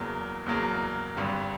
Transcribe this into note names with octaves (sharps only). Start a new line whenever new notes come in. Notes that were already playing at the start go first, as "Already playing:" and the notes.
Already playing: F#1 E2 C#3 F#3 A#3
F#1 E2 C#3 F#3 A#3
G#1 G2 D3 G3